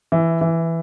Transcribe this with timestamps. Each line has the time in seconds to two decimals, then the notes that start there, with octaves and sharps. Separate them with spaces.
0.12 E3
0.41 E3